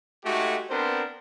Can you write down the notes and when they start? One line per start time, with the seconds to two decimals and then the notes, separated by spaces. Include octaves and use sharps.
0.24 G#3 A3 D#4 F#4 G4
0.69 B3 C4 D4 A#4 C5